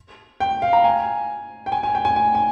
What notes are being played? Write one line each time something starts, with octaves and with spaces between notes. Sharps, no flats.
G5
F5
A#5
G#5
G5
G#5
G#5
G5
G#5
G#5
G#5